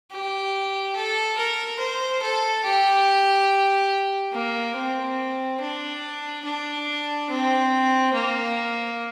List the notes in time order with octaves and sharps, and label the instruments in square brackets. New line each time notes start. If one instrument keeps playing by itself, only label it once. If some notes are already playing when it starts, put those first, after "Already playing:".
[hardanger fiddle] G4
A4
A#4
C5
A4
G4
A#3
C4
D4
D4
C4
A#3